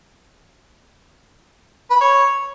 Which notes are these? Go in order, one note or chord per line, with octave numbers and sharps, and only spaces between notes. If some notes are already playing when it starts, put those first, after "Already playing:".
B4
B5
C#5